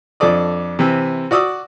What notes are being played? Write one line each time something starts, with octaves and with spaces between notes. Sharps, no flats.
F2 D4 A4 D5 D#6
C3 E3 C4
F#4 D5 D#6 E6